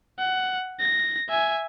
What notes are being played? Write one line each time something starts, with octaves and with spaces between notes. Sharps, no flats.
F#5
A#6
E5 G#5